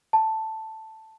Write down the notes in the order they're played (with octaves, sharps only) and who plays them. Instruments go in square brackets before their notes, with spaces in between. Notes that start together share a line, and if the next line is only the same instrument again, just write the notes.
[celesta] A5